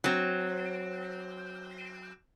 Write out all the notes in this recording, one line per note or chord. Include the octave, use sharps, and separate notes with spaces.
F#3 C4